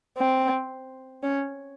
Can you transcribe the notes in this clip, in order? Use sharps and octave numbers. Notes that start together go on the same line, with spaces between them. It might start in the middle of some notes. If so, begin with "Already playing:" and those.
C4
C#4